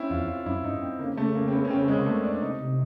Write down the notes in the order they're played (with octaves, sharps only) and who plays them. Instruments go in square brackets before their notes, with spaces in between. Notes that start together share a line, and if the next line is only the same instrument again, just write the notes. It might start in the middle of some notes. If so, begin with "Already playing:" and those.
Already playing: [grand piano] C4 C#4 E4
[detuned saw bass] E2 [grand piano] F4
[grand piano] F4
[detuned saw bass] F#2 [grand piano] E4
[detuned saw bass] G2 [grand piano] D#4
[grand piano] C4
[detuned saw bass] C#3 [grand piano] A#3
[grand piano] A3
A#3
C4
B3
C#4
C4
G#3
A#3
A3
D4
[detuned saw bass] C3 [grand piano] D#4